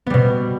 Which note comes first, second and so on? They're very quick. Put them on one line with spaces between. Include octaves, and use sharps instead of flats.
B3 G3 B2